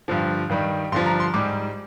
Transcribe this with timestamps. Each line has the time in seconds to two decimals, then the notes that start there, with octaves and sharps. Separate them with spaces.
0.08 G2 D3 F3
0.49 G2 D#3 G3
0.92 G2 D3 F3 C6
1.06 A#5
1.20 C6
1.34 G#2 G3 D6